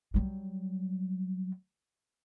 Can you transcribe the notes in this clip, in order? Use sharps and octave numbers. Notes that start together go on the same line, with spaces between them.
F#3 G3